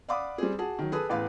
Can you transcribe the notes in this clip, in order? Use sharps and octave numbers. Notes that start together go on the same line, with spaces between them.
D5 F5 F#5 B5 D6 D#6
G3 C4 G#4
F#4 G#4 A5
D#3 F#3
G#4 A4 B4 D#6
A1 E2 B4 F5